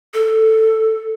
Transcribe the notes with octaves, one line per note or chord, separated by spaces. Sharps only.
A4